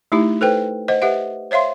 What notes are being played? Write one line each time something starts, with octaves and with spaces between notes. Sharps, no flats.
A3 D#4 E4 G4
A4 B4 C5 G5
C5 D#5 F#5
G4 B4 E5 F#5
C5 C#5 E5 F5 C6